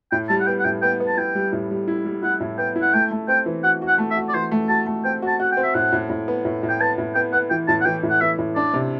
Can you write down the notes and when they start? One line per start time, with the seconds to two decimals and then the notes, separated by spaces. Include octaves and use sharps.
0.12 A2 G5
0.29 G3 A5
0.40 F#5
0.47 B3 G5
0.59 F#5
0.65 A2 G5
0.82 B3 G5
1.00 B3
1.08 A5
1.17 E4 G5
1.35 G3
1.53 A2
1.71 G3
1.88 E4
2.05 G3
2.23 E4 F#5
2.40 A2
2.58 B3 G5
2.76 E4
2.82 F#5
2.94 A3 G5
3.11 A3
3.28 C4 G5
3.46 E3
3.63 F#4 F#5
3.82 F#4
3.88 F#5
3.98 A3
4.10 E5
4.17 F#4
4.29 D5
4.34 E3 C5
4.51 A3
4.69 F#4 A5
4.86 A3
5.04 C4 G5
5.22 F#4
5.28 A5
5.40 F#4 F#5
5.52 G5
5.57 C4
5.63 E5
5.75 A2 F#5
5.92 A2
6.09 A2
6.28 B3
6.45 A2
6.63 A2
6.69 G5
6.80 B3 A5
6.98 A2
7.15 B3 G5
7.32 B3 F#5
7.50 E3 G5
7.68 A2 A5
7.81 F#5
7.86 E3 G5
8.03 A2
8.10 F#5
8.21 E3 E5
8.38 A2
8.56 D4 D5
8.74 C3